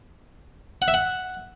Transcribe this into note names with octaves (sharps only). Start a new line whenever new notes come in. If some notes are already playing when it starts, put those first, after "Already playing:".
F#5
E5
F#5